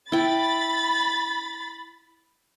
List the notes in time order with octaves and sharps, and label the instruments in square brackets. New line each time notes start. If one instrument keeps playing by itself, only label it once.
[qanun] E4 G5 [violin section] B5 A6